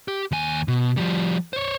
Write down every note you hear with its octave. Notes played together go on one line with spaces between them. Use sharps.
G4
D#2 G#5
B2
F3 G3
C5 C#5